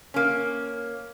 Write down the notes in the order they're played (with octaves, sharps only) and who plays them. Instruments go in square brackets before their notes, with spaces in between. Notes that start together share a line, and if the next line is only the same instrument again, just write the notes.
[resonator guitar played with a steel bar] A#3 C#4